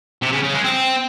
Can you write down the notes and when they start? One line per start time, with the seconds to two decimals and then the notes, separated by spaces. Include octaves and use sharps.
0.22 C3
0.32 C#3
0.43 C#3
0.53 G#3
0.64 C4